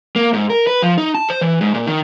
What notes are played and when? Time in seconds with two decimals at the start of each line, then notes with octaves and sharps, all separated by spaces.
0.16 A#3
0.33 G#2
0.50 A#4
0.67 B4
0.82 F3
0.98 D#4
1.15 A5
1.30 C5
1.41 E3
1.61 G#2
1.74 A#2
1.87 D#3